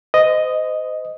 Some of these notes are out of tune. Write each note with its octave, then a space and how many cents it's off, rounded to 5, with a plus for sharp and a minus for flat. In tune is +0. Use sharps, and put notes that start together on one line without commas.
C5 -35 D#5 +0